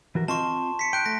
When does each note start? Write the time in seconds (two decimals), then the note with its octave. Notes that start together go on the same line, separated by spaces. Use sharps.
0.15 E3 F#4 A#4
0.28 C4 F4 D#5 A5 C6 C#6
0.79 B6 C#7
0.93 G5 F#6 D7
1.06 A3 A#6